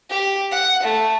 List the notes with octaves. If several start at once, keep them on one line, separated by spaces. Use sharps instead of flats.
G4
F#5
A3